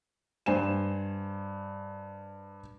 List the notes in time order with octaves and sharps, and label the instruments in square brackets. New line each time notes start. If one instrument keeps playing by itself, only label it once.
[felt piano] G2 C5 G#5 E7